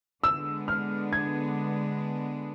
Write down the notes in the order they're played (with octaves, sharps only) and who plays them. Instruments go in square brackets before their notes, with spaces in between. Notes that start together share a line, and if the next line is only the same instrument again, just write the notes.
[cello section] D3 G#3 B3 D4 [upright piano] E6
[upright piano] F6
G#6